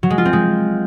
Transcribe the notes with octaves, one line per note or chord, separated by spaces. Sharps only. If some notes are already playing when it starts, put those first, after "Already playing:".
F#3
G#3
F4
C4
G#3